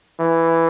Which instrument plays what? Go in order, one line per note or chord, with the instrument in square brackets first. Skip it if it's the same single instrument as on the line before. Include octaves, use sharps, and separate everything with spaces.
[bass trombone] E3